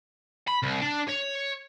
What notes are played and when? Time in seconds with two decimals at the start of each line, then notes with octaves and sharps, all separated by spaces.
0.48 B5
0.63 C2
0.81 D4
1.08 C#5